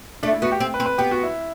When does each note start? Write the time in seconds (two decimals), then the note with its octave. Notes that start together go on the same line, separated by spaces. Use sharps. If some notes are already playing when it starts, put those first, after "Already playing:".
0.23 A3 D4
0.33 E4
0.42 B3 F#4
0.51 G4
0.60 C4
0.74 B4
0.80 C4
0.86 B4
0.98 B3 G4
1.11 F#4
1.23 E4